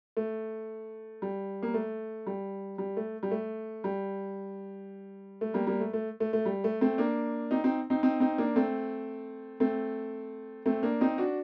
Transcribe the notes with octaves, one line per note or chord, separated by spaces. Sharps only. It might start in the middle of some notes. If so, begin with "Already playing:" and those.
A3
G3
A#3
A3
G3
G3
A3
G3
A3
G3
A3
G3 A#3
G3 A#3
A3
A3
A3
A3
G3
A3
A3 C4
A#3 D4
C4 D#4
C4 D#4
C4 D#4
C4 D#4
C4 D#4
A#3 D4
A3 C4
A3 C4
A3 C4
A#3 D4
C4 D#4
D4 F#4